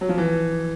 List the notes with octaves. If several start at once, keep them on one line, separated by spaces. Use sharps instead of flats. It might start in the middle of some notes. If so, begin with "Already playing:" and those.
F#3
F3
E3